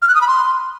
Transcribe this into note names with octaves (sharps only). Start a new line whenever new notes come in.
F6
F#6
D#6
B5
C6